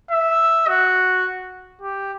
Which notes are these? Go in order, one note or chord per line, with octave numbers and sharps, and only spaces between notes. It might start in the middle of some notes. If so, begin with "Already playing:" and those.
E5
F#4
G4